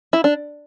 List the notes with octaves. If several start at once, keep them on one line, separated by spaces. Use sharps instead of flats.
E4
D4